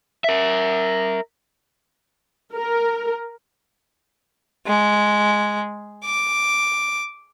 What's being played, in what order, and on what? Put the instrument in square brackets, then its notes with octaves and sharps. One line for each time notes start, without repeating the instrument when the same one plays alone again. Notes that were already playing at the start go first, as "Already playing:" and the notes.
[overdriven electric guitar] A#4 E5
[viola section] A#4
[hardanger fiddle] G#3
D6